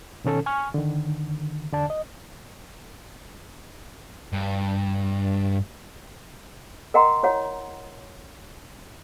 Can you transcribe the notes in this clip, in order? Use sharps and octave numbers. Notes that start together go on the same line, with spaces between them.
B2 D#3 C#4 A4
G#5 C#6 F6
D3 D#3
E2 D3 D5 A5
D#5
G2
A#4 D#5 F#5 G5 A#5 C6
E4 C#5 F#5